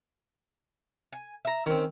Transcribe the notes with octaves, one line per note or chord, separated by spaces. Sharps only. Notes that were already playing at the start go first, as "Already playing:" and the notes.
G#5
E5 A#5
D#3 C4 C#4